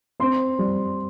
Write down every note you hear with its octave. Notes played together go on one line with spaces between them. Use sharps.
C4 C6
G3